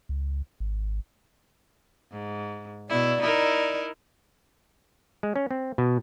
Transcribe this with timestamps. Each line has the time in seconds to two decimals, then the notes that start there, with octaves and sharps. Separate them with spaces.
0.09 C#2
0.60 G#1
2.12 G#2
2.89 B2 E4 D5
3.22 D#4 E4 A#4
5.23 G#3
5.36 C#4
5.51 C4
5.78 B2